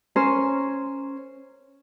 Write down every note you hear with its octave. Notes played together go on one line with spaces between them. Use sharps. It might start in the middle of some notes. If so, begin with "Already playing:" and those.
C#4 A#4 C5